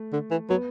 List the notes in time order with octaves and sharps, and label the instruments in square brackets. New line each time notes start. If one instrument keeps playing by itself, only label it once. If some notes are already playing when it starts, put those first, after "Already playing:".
Already playing: [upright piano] A3
[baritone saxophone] D3
E3
[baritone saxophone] F#3 [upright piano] B3